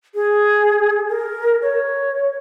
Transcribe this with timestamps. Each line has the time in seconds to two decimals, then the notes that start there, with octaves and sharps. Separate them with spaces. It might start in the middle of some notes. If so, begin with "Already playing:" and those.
0.15 G#4
1.09 A#4
1.62 C#5